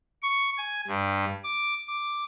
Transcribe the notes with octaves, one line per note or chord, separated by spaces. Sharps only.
C#6
G#5
G2
D6
D6